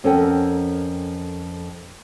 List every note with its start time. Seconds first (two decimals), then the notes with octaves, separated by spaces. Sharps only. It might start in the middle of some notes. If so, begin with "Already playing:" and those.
0.04 F2 C#4 A4 A#4 F#5 G5